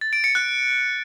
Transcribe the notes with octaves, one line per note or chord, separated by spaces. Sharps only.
A6
D7
C#7
F#6